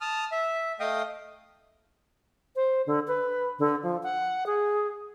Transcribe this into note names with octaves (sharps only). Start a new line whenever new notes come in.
A5 D#6 F6
E5
A3 D#5 F5 G5 D#6
C5
D3
B4
D3
F3
F#5
G#4